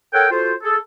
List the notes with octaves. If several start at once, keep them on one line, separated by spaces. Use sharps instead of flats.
A4 A#4 C#5 F#5 G5
F4 F#4 A4 C5
G#4 A4